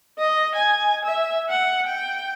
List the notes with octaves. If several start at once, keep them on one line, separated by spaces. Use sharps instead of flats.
D#5
G#5
E5
F#5
G5